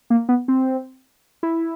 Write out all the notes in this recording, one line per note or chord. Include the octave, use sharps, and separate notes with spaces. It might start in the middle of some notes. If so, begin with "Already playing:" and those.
A#3
B3
C4
E4